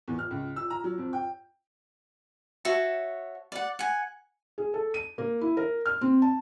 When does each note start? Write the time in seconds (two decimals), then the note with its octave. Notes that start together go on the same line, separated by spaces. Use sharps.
0.08 E2
0.19 F6
0.31 C#2
0.56 E6
0.70 A#5
0.84 F#3
0.98 F2
1.13 G5
2.65 F#4 C#5 E5 A5
3.52 D5 F#5
3.79 F#5 G#5
4.58 G#4
4.74 A4
4.94 D#7
5.18 A#3
5.41 E4
5.57 A#4
5.86 F6
6.01 C4
6.22 A5